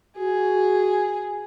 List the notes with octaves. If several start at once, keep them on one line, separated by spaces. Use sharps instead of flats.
F#4 G#4